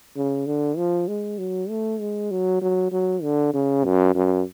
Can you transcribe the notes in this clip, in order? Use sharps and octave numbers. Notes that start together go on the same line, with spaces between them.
C#3
D3
F3
G#3
F#3
A3
G#3
F#3
F#3
F#3
D3
C#3
F#2
F#2